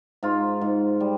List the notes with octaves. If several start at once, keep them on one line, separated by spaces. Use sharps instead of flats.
G#2 F4
G#2
G3